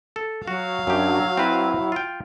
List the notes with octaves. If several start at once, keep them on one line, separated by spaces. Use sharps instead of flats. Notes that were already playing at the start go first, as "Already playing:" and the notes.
A4
F#3 F#4 F5
F#2 D4 G4
C4 E4 B4
F4 G5